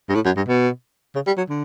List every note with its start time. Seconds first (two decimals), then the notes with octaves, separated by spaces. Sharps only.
0.09 G2
0.15 A2
0.25 F#2
0.36 G2
0.48 B2
1.15 C#3
1.27 G3
1.38 F#3
1.49 D3